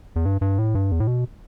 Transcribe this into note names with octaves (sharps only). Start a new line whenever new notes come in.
E2
G2
G2
A2
G2
E2
A2
B2